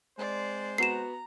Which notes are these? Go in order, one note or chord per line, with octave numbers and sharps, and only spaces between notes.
G#3 C4 C5 D5
B3 F#4 A#5 C7 E7